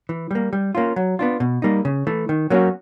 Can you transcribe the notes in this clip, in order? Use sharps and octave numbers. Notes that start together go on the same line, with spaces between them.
E3
G3 A#3
G3
A#3 C#4 F4
F#3
B3 D4 F4
B2
G3 A#3 D#4
C#3
E3 A3
D#3
F#3 A#3 C#4 F#4